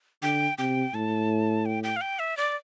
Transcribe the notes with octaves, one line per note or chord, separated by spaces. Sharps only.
D3 G5
C3 G5
A2 A5
G5
G5
F5
G5
E5
D5